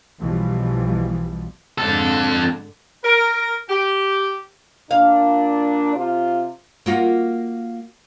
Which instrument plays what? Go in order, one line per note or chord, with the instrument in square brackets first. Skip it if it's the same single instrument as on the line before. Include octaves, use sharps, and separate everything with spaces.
[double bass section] B1 B2 E3 F3 G3
[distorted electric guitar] F2 A4 [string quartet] G#2 D3
[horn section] A#4
G4
[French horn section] A#2 D4 [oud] F5
[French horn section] C3 F4
[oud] A#3 F4 F#4